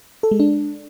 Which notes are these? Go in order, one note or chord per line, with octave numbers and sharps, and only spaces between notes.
A4
G#3
D4